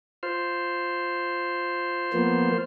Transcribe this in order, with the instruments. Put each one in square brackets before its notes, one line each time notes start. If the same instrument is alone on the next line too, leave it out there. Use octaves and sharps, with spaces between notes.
[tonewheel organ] F4 C5
[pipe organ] F3 A#3 B3